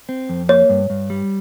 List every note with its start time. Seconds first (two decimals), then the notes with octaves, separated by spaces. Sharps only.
0.09 C4
0.29 F2
0.49 A#3 C#5
0.69 G2
0.90 G2
1.10 G3